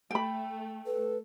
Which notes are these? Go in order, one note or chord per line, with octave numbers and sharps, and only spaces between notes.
A3 G5 B5
A4 B4